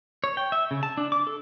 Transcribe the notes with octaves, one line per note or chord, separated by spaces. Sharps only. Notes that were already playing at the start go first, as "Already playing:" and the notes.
C#5
G5
E5
C#3
A5
D4
D6
A4